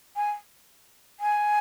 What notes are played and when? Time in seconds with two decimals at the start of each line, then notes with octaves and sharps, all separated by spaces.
0.16 G#5
1.20 G#5